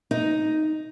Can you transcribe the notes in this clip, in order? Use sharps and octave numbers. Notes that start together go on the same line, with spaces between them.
D#4